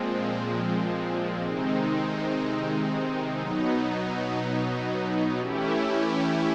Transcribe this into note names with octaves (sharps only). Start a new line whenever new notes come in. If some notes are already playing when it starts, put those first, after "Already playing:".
Already playing: A#2 F3 G#3 C4
C3 D#3 G#3 C4 D#4
B2 F#3 B3 D#4
E3 A3 C#4 E4 G4